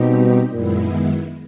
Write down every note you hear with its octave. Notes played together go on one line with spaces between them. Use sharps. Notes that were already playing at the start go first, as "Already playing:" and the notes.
Already playing: B2 G3 C4 D#4 G4
F#2 A#2 D#3 G#3 B3 E4